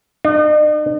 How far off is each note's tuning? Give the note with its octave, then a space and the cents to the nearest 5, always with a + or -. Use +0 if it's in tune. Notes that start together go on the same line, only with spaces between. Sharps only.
D#4 -45